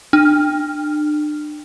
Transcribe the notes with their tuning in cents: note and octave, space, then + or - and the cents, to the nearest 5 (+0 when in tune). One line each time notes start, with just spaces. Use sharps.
D4 +35